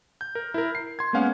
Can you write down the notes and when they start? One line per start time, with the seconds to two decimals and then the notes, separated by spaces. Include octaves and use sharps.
0.21 G6
0.35 A#4
0.54 E4 A#4
0.75 C7
0.99 C6 G#6
1.13 G#3 A#3 B3 C#4 F5 F#5